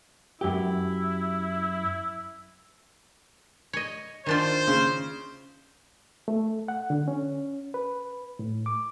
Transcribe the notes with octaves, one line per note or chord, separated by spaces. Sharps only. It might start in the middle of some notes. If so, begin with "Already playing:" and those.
F#2 E4 G4
C#5 D#5
D#3 D4 F4 C5
C#3
A3
F#5
D3
C#4
B4
A2
D6